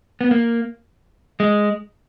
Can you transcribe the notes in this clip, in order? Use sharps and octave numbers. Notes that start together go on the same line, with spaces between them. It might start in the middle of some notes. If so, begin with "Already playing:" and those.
B3
A#3
G#3